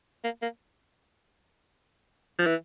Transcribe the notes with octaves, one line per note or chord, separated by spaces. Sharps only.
A#3
A#3
F3
E3